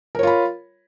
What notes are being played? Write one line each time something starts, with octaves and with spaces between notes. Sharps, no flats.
F4 A#4 C#5 B5